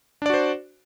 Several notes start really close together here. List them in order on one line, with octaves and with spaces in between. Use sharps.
D4 D5 F#4 C5